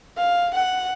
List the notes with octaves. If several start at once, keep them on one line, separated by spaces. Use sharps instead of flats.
F5
F#5